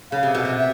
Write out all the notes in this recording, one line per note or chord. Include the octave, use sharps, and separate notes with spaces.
C#3 F5
C3
B2
C3
E5